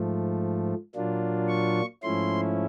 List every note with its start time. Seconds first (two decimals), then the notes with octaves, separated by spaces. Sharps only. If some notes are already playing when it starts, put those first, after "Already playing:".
Already playing: G#2 F3 A3
0.95 A#2 F#3 A#3 D4 F4
1.49 C#6
2.03 G#2 F3 A3 C#4 E4 C6